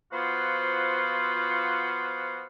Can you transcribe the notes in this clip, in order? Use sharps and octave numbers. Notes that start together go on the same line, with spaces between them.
F3 B3 F4 F#4 C5